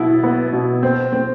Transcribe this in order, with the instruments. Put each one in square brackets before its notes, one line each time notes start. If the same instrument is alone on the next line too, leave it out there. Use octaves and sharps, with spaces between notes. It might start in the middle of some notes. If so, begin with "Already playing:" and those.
Already playing: [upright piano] B2 F#3 B3 E4
B3
B2
C4
C4